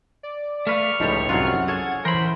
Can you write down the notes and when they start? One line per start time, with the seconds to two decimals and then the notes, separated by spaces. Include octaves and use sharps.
0.23 D5
0.67 A3 B4 F5 C#6 F6
1.00 C#2 A2 F3 G3 D#4 C#5
1.29 C2 F#2 F#3 F4 F#5
1.68 G#4 A4 C#5 G#6
2.05 E3 A#4 C5 B5 C6